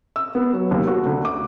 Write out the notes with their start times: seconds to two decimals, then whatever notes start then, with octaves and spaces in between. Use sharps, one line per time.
0.16 E6
0.35 B3
0.53 F#3
0.71 D#2
0.88 F#4
1.06 D2
1.25 D6